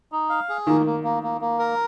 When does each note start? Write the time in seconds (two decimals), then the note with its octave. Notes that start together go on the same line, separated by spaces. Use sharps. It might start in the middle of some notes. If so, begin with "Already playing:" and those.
0.12 D#4
0.29 F5
0.49 G#4
0.67 D#3 A#3
0.86 A#3
1.03 A#3
1.23 A#3
1.41 A#3
1.59 A#4